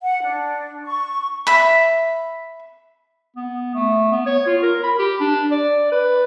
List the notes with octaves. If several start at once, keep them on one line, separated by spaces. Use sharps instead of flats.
F#5
D4
C#6
E5 B5
B3
A3
B3
C#5
F4
A#4
B5
G4
D4
D5
B4